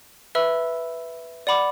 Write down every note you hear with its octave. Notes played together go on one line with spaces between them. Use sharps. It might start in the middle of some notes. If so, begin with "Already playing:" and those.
B4 E5 B5 E6
D5 F#5 B5 D6